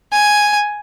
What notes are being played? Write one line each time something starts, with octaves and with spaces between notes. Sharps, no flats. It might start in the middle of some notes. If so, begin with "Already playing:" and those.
G#5